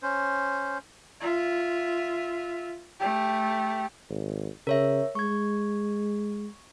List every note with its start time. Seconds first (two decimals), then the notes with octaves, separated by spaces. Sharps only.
0.03 C#4 C5
1.20 F4 E5
3.00 A3 G4
4.09 G#1
4.67 C#3 A#4 C#5 E5
5.15 G#3 C#6 G#6